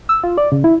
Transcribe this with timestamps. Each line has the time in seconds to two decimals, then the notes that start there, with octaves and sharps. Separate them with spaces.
0.09 E6
0.24 F4
0.38 D5
0.52 C#3
0.64 E4